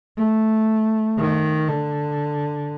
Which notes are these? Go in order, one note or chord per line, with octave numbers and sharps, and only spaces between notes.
A3
D#3
D3